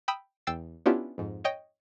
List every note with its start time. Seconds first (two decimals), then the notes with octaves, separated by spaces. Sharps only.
0.08 G5 B5 D#6 E6
0.47 E2 G5 E6 A6 C7
0.86 B3 C#4 D4 E4 F4 G4
1.18 F2 G#2
1.44 C#5 D#5 G5